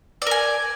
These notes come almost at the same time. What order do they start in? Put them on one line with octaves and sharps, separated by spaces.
D5 A#4 G#5